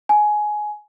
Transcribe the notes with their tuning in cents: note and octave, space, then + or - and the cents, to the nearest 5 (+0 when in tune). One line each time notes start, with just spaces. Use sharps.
G#5 +15